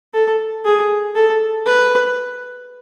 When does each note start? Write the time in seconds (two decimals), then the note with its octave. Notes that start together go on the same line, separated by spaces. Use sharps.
0.14 A4
0.65 G#4
1.15 A4
1.66 B4